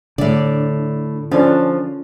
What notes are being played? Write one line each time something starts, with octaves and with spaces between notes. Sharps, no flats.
A2 D3 D5
F3 C#4 D4 A4